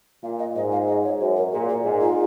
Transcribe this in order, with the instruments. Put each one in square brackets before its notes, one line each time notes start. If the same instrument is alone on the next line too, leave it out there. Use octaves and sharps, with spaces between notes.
[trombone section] A#2 [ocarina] F5
[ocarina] D#5
[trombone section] G#2 [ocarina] D#5
[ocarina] F5
D#5
C#5
[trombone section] F#2 [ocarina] C5
[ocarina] A#4
[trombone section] A#2 [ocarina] G#4
[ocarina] G#4
[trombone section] G#2
[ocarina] F4